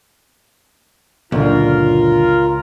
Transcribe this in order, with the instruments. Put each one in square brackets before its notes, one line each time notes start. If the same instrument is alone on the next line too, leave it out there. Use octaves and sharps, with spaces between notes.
[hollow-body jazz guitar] C#2 [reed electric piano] F#2 A#2 D3 [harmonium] F4 A#4